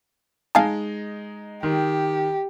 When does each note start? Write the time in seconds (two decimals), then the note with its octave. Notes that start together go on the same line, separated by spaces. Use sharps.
0.55 G#3 D#4 F5 G#5 A5
1.63 D#3 G4